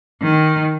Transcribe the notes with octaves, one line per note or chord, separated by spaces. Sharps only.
D#3